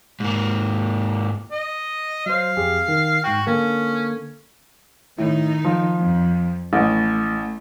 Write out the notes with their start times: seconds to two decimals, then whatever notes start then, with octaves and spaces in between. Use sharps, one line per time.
0.20 G#2 A#3
1.51 D#5
2.26 F#3 C5 F5
2.57 F2 G4 G#4
2.88 D#3
3.24 G#2 F#4 G5
3.47 D3 A#3 C#4 A4
5.18 A2 D#3 D#4
5.65 F3
5.99 F2
6.73 A1 A3